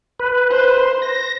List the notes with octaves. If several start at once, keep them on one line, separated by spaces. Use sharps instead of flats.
B4
C5
A#6